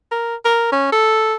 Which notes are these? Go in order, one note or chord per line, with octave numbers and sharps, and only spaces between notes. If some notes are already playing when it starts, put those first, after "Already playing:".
A#4
A#4
C#4
A4